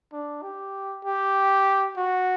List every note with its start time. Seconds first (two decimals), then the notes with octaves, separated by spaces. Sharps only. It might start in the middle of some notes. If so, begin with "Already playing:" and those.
0.13 D4
0.43 G4
1.05 G4
1.97 F#4